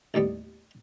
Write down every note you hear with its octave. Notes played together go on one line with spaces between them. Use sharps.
A1 D#2 G3 B3